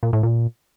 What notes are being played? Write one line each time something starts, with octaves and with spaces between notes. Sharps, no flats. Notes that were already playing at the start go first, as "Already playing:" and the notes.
A#2
A2
A#2